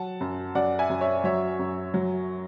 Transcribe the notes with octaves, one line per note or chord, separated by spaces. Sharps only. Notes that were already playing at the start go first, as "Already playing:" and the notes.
Already playing: F#3 F#5 A5
F#2
F#2 D5 F#5
E5 G#5
F#2
C#5 E5
F#3 C#5 E5
F#2
F#3